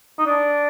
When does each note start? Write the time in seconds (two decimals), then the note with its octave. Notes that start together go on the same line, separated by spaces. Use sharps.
0.18 D#4
0.26 D4